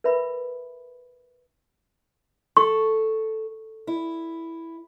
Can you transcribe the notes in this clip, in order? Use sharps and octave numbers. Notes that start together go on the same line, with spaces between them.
A#4 B4 E5 B5
A4 C#6
E4